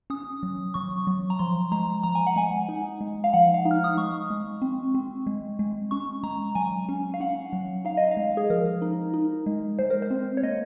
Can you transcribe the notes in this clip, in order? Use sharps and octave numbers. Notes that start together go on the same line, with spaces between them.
C#4 D#6
F#3
F#3 C#6
F#3
A#5
F3 C6
G#3 A#5
F3 A#5
G#5
F#5
G#3 G#5
D#4
G#3
F5
F3 F#5
F5
D#4
F6
D#6
G#3 C#6
G#3
C4
C4
G#3
G#3
C#4 C#6
G#3 A#5
F#3 G#5
C#4
F5
C#4 F#5
F#3
D#4 F5
D#5
F5
G#3
G#4
F3 A#4
D#4
D#4
G#3
G#3 C5
A#4
C5
C4
C#5
A#3 D#5